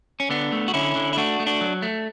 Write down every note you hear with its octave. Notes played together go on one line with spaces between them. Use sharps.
C#4
D3 B3 D4
A3
F#4
D3 C#4 E4
D3
E4
A3 D4 F#4
A3
D4 F#4
F#3
A3